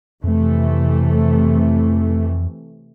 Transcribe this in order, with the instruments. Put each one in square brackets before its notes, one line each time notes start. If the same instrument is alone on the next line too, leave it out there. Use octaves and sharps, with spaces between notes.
[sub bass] F2 [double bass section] C3 E3 A3